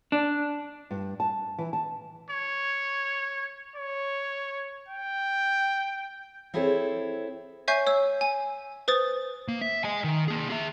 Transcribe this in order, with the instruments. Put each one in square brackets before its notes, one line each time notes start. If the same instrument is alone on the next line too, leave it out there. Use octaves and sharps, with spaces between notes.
[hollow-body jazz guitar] D4
[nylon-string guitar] G2
A5
E3
A5
[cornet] C#5
[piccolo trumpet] C#5
G5
[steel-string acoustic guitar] C4 E4 G#4 A4 C5 C#5
[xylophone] C#5 E5 G#5 C#6 G6 C7
C#5 E6
G#5
B4 C5 D#6 A6
[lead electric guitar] A#3
E5
D#5 G#5
D#3
A#3 G#4
G#4 E5